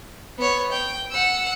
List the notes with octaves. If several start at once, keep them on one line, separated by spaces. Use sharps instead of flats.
B3 C#5
G5
F#5 E6